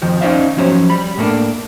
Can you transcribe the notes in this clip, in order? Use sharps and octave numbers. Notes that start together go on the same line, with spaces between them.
F2 D#3 F3
C#4 D#4 C5 D5 E5 F5
F3 F#3 C#4 C5 C#5
G3 B5
A2 A3 A#3 D4